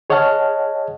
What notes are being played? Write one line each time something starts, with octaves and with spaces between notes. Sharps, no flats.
G#4 C#5 D#5 F#5 A5 F6